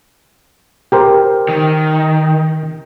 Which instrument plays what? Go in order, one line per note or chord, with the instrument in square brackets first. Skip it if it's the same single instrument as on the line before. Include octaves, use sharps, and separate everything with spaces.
[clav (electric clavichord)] G4 A#4 C5
[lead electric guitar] D#3